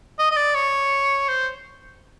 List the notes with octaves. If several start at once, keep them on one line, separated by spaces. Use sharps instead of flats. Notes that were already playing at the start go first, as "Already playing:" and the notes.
D#5
D#5
D5
C#5
C5